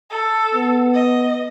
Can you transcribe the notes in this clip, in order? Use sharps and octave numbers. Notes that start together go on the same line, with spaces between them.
A4
B3
D#5